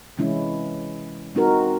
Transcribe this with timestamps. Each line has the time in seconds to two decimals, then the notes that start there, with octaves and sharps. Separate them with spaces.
0.17 C3 E3 G#3 C#4 E4
1.35 G#3 C4 D#4 F#4 A#4